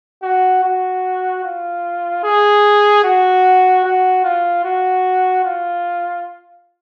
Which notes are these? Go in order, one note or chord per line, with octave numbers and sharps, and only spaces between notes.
F#4
F#4
F4
G#4
F#4
F#4
F4
F#4
F4